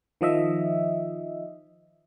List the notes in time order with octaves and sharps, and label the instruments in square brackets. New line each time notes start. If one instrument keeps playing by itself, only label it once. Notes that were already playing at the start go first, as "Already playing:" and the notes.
[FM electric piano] D#3 F3 D#5 E5